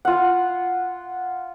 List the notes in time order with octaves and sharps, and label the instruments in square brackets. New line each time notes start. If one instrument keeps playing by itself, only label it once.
[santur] F4 F#5